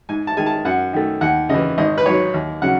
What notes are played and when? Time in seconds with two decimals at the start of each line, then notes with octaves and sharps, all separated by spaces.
0.09 G#2 G#5
0.27 A5
0.37 D#3 G#3 G#5
0.46 A5
0.65 F#2 F#5
0.93 D#3 A3
1.21 D#2 F#5
1.49 C#3 E3 D#5
1.78 G#1 D#5
1.98 B4
2.06 G#2 F#3 C#5
2.34 D#2
2.62 C#3 F#3 F#5